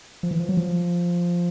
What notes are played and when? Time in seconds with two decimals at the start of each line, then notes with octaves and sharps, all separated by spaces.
0.23 F3
0.31 E3
0.40 F3
0.49 F#3
0.57 F3